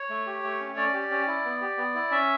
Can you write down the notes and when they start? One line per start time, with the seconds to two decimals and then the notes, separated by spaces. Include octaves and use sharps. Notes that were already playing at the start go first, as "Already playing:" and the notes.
Already playing: C#5
0.10 A3
0.26 G4
0.43 A3
0.60 C#4
0.76 C#4 D5
0.94 G4
1.11 C#4
1.27 E4
1.45 B3
1.61 G4
1.78 B3
1.94 E4
2.11 C#4 E5